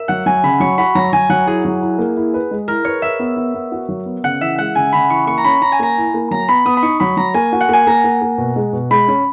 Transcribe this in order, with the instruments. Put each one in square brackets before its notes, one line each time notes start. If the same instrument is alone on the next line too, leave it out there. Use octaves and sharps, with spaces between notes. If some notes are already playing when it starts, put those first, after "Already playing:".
Already playing: [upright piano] A#4 [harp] E5
[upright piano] F#3 [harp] F#5
[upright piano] F#3 [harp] G#5
[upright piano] C#3 [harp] B5
[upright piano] F#3 [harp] C#6
[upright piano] F#4 [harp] B5
[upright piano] F#3 [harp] A#5
[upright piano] F#3 [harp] G#5
[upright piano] F#3 [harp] F#5
[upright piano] E4 [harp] G#4
[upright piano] F#3
E4
A#3
E4
B4
G#3
[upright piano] E4 [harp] A#4
[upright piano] B4 [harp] C#5
[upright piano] B4 [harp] E5
[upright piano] B3
B3
B3
F#4
F#3
B3
[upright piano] C#3 [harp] F#5
[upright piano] E3 [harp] E5
[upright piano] G#3 [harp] F#5
[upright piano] C#3 [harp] G#5
[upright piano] C#3 [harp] B5
[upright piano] E3 [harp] C#6
[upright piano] A#3 [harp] C#6
[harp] A#5
[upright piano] C#4 [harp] B5
[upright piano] C#4 [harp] A#5
[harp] G#5
[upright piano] A#3 [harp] A#5
[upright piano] E4
A#3
[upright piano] F#3 [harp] A#5
[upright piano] B3 [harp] B5
[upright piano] B3 [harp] D#6
[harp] B5
[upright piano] D#4 [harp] C#6
[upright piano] F#3 [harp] B5
[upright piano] F#3 [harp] A#5
[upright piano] A#3 [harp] G#5
[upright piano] F#4
[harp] F#5
[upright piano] A#3 [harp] G#5
[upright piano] A#3 [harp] A#5
[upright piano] A#3
A#3
B2
G#3
B2
[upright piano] G#3 [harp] B5
[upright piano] C#4